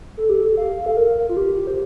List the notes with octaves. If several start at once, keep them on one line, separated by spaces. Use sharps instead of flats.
A4
G4
A4
F5
A4
A#4
F4
G4
C5